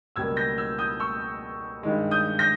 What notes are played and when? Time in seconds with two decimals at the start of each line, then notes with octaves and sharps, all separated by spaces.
0.16 C#2 B2 G3 A#3 E6 G#6
0.36 G6 A#6
0.58 E6 G#6
0.79 D#6 G6
1.00 C#6 E6
1.83 G2 D#3 G#3
2.11 D#6 G6
2.39 G6 A#6